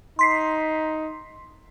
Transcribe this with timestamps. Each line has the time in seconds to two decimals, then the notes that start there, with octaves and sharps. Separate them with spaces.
0.19 D#4 C6 B6 C7